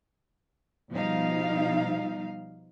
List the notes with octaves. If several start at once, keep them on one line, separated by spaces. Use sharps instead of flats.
B2 F3 G3 D#4 F5